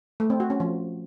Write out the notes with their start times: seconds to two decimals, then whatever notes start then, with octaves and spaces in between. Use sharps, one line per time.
0.20 A3
0.30 C4
0.40 F#4
0.50 C#4
0.60 F3